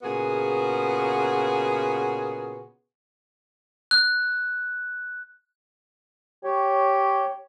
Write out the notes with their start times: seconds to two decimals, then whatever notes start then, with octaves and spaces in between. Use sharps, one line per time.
0.02 A#2 C#3 B3 F#4 G#4
3.91 F#6
6.44 G4 C#5